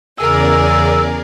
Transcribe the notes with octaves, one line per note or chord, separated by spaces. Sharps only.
E2 C#3 G#4 A#4 D5 E6